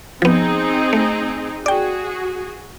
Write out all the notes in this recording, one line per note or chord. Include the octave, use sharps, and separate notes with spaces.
F3 B3 C4 D#4 G#4
A3
F#4 G#4 D5 G5